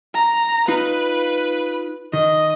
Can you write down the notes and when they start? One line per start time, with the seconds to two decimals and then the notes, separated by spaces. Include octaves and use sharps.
0.14 A#5
0.68 D#4 F4 B4
2.13 D#3 D#5